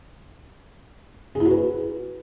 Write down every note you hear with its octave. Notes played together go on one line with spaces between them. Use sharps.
G#4
E4
F#4
B4